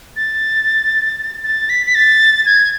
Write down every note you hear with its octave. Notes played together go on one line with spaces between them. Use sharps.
A6
A6
B6
B6
A6
G#6